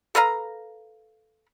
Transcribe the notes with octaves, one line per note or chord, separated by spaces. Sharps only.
A4 B4 F5 A#5